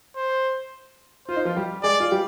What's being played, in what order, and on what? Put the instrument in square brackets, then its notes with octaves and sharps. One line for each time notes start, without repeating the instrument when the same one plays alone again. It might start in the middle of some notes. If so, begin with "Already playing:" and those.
[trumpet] C5
[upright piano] F4 [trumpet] C5
[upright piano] D#4
F3 F4
G3 G4
[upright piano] G#3 G#4 [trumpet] D5
[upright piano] F4
G3 G4